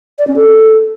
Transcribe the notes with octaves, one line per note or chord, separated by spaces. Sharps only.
D5
C#4
A4